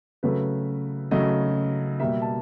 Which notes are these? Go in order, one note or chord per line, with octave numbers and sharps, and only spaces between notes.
C#3 F#3 A3 B4
C#3 F#3 A3 D#5
B2 G3 A#3 E5
A5